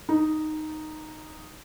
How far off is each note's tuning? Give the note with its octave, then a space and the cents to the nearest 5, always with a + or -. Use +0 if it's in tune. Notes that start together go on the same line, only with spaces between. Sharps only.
D#4 -5